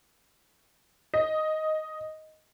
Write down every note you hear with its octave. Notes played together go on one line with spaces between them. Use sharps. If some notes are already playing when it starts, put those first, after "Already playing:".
D#5